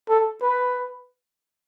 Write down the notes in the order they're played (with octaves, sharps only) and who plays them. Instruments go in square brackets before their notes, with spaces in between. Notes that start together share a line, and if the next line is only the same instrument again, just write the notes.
[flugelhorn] A4
B4